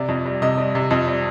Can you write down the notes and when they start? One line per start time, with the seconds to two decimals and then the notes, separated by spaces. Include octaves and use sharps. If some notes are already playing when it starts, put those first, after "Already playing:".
Already playing: C3 D5
0.08 F2
0.26 G3
0.42 C3 D#5
0.58 G3
0.75 C3
0.91 F2
1.07 G3